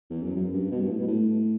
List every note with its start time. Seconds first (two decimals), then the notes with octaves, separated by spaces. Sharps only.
0.10 E2
0.22 F#2
0.35 F#2
0.53 G2
0.71 B2
0.81 G2
0.90 A2
0.99 B2
1.07 A2